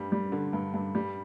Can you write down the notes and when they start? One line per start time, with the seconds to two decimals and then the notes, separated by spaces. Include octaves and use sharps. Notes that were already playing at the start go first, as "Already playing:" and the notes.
Already playing: G2 G3
0.12 G3
0.32 D3
0.53 G2
0.74 G2
0.95 G3